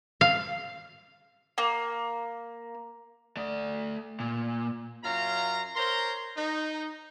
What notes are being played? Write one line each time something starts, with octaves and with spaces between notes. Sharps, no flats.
F5
A#3
A3 D5
A#2
F#2 F#3 F4 F5 A#5
A#4 C5 C#5 A#5 C6
D#4